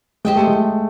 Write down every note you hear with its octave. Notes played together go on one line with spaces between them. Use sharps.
G#3 G4 C5 D#5 G5
A3
G#3